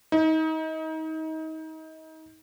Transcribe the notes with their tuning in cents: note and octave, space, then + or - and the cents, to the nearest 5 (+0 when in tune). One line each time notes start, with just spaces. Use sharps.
D#4 +30